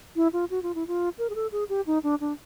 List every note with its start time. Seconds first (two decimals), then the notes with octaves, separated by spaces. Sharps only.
0.16 E4
0.33 F4
0.50 F#4
0.62 F4
0.75 E4
0.87 F4
1.18 A#4
1.29 G#4
1.35 A4
1.52 G#4
1.69 G4
1.87 D#4
2.03 D4
2.20 D4